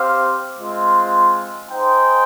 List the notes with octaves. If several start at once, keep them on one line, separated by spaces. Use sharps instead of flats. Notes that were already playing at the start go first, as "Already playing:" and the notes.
Already playing: C4 G4 C5 F5
G#3 C4 F4
D#4 G#4 C5 G5